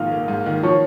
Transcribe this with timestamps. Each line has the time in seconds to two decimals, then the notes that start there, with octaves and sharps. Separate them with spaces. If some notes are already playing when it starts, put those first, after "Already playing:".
Already playing: A#1 G#2 D#3 F5 F6
0.11 A#3
0.28 G#2
0.46 D#3
0.63 F3 C#5 C#6